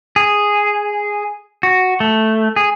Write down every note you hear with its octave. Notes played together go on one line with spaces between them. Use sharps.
G#4
F#4
A3
G#4